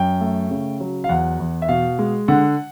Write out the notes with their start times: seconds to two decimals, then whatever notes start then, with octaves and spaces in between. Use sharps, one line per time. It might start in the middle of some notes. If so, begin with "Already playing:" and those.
Already playing: F#2 G5
0.21 A3
0.50 C#3
0.80 F#3
1.04 F5
1.09 E2 F#5
1.39 E2
1.62 E5
1.68 B2 F5
1.99 G#3
2.28 D3 F#5